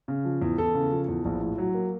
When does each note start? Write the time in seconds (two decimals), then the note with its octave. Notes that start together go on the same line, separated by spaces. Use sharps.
0.08 C#3
0.25 F3
0.42 E2
0.58 E2 A4
0.74 C#3
0.92 F3
1.08 E2
1.25 A#1
1.41 A2
1.58 F#3
1.74 A#3